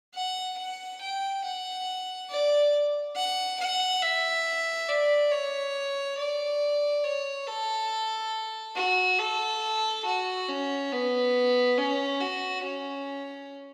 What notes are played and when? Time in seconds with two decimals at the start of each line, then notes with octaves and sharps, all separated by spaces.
0.14 F#5
0.58 F#5
1.01 G5
1.44 F#5
2.30 D5
3.16 F#5
3.60 F#5
4.02 E5
4.88 D5
5.32 C#5
6.18 D5
7.04 C#5
7.47 A4
8.76 F#4
9.20 A4
10.05 F#4
10.49 C#4
10.92 B3
11.78 C#4
12.21 F#4
12.64 C#4